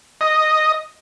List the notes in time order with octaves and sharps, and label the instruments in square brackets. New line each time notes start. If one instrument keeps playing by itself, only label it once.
[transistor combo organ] D#5